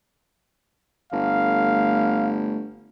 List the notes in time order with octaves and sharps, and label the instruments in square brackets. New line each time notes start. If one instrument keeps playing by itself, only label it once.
[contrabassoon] G1 [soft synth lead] A3 [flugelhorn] F5